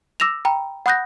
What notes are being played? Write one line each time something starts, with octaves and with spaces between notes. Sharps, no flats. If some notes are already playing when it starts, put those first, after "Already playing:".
D6 E6 A#6 E7 F7
G5 A#5 B5
F#5 B5 D#6 F#6 G6 A#6